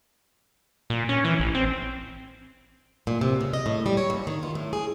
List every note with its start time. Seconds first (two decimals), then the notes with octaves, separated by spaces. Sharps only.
0.90 A#2
1.09 C#4
1.24 E3
1.40 A1
1.55 C4
3.07 A#2
3.21 C3
3.41 C#3
3.53 D#5
3.66 A2
3.86 G3
3.97 C#5
4.10 D#2
4.27 D#3
4.43 F4
4.55 A2
4.73 G#4